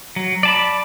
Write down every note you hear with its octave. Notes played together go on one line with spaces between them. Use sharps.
F#3
D5 A5 B5